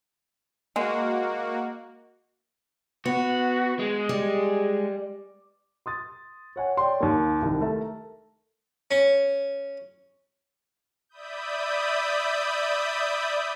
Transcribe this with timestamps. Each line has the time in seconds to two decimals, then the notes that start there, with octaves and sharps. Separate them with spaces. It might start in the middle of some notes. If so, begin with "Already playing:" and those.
0.76 G#3 A#3 F#4
3.06 B3 F#4
3.79 G#3
4.09 G3
5.86 C6 D#6 A6
6.56 C#5 F#5 G#5
6.77 C#5 D5 G5 C6
7.00 D#2 A#3
7.42 C2 D#3
7.61 A3 A#4 E5 A5
8.91 C#4
11.09 D5 E5 B5 D#6 G6